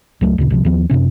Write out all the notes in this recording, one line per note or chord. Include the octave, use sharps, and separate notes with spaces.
C#2 F#3 A3
D2 A#2 C#3
C2 C3 F3
D#2 F3 B3
F#1 F#2 C3 C#4